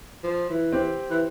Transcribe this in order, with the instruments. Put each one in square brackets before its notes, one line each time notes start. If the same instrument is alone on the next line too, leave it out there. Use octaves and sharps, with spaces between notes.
[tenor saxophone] F3
E3
[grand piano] C4 G4
[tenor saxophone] E3